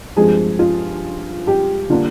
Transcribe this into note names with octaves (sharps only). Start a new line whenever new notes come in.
G2 F3 G#3 C4 G#4
F4
G4
D3 G3 A#3 D4 F4